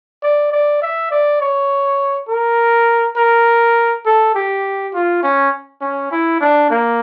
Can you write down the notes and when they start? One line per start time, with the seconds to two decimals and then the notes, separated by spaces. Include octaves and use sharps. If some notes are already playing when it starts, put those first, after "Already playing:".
0.23 D5
0.52 D5
0.82 E5
1.11 D5
1.41 C#5
2.29 A#4
3.17 A#4
4.06 A4
4.35 G4
4.94 F4
5.23 C#4
5.81 C#4
6.12 E4
6.41 D4
6.70 A#3